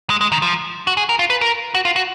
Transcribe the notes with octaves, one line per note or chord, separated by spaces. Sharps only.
G#3
G#3
D#3
F3
F#4
G#4
A#4
F4
B4
A#4
F#4
F4
F#4